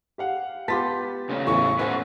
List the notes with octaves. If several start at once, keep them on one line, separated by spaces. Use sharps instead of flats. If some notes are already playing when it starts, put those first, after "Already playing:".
G4 F5 F#5
B3 F4 G4 A5 A6 B6
C#3 A3
E2 A2 E3 C#6
A3 C#4 B4 C5 E5 F#5 C6